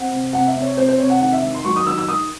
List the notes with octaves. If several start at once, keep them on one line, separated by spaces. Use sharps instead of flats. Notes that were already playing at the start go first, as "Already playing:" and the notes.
Already playing: C4 F#5
C3
C3 F#5
E5
C3
C#5
C4 C5
C5
C3 C#5
F#5
D#3 F#5
E5
D#3
C6
F#3 C#6
D#6
D#3 E6
E6
D#3 D#6